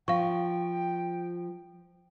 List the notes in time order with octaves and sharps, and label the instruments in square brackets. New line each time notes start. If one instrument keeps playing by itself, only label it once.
[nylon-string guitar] F3 [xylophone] F5 C#6 [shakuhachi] G5